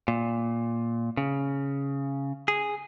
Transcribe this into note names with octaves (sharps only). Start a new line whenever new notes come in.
A#2
C#3
G#4